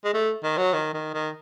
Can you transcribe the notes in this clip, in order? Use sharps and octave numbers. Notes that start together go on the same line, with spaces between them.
G#3
A3
D#3
F#3
D#3
D#3
D#3